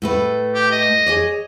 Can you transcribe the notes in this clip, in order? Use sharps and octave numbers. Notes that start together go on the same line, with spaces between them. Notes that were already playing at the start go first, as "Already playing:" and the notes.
A2 A3 B4
G4
D#5
G#4 C#5 D5